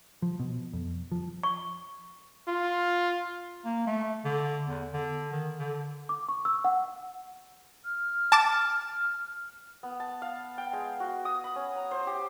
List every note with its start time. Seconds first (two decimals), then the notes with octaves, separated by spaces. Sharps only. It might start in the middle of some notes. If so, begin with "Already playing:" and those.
0.22 F3
0.40 B2
0.73 F2
1.12 F3
1.43 C#6
2.48 F4
3.65 A#3
3.87 A3
4.25 D3
4.65 E2
4.93 D3
5.32 D#3
5.59 D3
6.09 D6
6.28 C#6
6.45 E6
6.64 F#5
7.85 F6
8.32 A5 D6 A6
9.83 B3
10.00 A5
10.22 F5
10.58 G5
10.73 G#3
11.00 F#4
11.25 D#6
11.44 B5
11.56 C#4
11.76 A#5
11.91 C5
12.07 G4